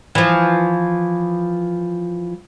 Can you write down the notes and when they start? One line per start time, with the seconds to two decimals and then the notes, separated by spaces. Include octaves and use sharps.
0.15 E3 F3